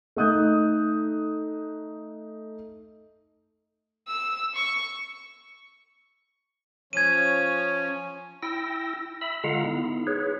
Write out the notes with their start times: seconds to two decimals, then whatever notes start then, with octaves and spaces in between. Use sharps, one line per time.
0.16 A3 D#4 D#6 F#6 G6
4.07 E6
4.55 C#6
6.93 F3 C#4 G#6 D#7
8.43 E4 G5 E6 A#6
9.21 E5 B5 E6
9.44 D3 G#3 F4 F5 F#5 A#5
9.64 B3 D#4 E4
10.07 G#4 B4 C#5